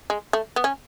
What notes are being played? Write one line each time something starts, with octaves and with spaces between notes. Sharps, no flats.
G#3
A3
B3
C#4